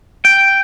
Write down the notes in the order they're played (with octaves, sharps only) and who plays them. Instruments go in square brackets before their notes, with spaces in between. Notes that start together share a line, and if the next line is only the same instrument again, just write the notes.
[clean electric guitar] G5